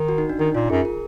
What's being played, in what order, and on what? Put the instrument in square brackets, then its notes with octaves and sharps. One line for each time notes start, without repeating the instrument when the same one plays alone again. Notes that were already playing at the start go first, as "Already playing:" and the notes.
Already playing: [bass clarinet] D#3
[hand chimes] F#4
D#4
D4
[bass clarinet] D#3 [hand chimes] D#4
[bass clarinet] A#2 [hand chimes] F4
[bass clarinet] F#2 [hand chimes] G#4
[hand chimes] A#4